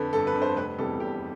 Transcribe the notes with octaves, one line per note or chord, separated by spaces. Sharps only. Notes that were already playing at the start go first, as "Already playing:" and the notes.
Already playing: F2 D3 B4
G1 A4
B4
F2 D3
C5
F1 B4
E2 C3 G3 A4
F1 G4